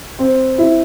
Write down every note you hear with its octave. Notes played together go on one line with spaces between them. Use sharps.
C4
E4